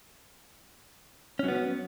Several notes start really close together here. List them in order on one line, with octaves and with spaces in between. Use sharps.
C#4 F#3 B3